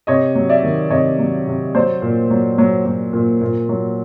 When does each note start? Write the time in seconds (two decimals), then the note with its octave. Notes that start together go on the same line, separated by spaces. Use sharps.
0.07 C3 C#5 D#5
0.35 F#3
0.49 D5 E5
0.63 D#3
0.90 C3 C#5 D#5
1.19 F#3
1.47 C3
1.75 F#3 C5 D5
2.02 A#2
2.31 F#3
2.58 F#3
2.86 F#3
3.13 A#2
3.41 A#2
3.69 F#3